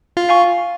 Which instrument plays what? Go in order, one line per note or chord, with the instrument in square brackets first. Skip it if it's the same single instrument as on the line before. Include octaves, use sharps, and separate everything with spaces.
[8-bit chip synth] F4
[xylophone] F5 G#5 C#6